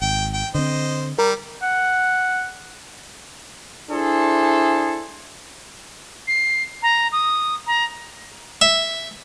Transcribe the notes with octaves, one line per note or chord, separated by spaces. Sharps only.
G#1 G5
G5
D3 C4 C5 D#5
G3 A#4
F#5
D4 E4 G#4 A4 C5
C7
A#5
D#6
A#5
E5